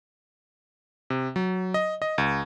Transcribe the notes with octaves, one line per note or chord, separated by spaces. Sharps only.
C3
F#3
D#5
D#5
C#2